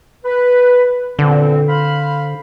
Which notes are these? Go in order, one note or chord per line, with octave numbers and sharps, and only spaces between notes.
B4
E2 A#2 D3 C4
C5 F5 B5